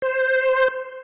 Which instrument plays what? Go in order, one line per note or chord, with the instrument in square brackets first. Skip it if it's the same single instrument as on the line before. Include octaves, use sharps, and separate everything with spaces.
[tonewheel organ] C5